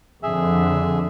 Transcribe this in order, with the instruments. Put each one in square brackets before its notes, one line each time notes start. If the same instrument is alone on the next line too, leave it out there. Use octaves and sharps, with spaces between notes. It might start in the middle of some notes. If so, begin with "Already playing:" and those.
[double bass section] F2 D3 [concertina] G#4 E5